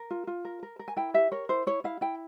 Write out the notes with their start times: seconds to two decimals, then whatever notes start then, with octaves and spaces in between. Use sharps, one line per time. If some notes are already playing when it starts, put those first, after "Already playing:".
Already playing: A#4
0.10 F4
0.27 F4
0.45 A#4
0.63 A#4
0.79 A#4
0.88 G#5
0.96 E4 G5
1.14 G4 E5
1.32 A#4 C#5
1.49 E4 C5
1.67 E4 C#5
1.84 E4 F5
2.01 E4 G5